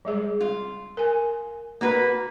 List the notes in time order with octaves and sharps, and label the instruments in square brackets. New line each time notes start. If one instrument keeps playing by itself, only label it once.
[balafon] G3 G#3 G#4
[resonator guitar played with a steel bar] F4
[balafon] A#4 G#5
[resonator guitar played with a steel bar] A#3 F#4 B4